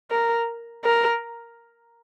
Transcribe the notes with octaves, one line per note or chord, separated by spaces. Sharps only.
A#4
A#4